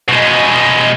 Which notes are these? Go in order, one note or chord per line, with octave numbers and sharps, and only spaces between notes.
B2 G#3